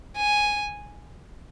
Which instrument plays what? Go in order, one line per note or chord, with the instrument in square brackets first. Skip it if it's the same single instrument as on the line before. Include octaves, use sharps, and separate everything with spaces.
[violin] G#5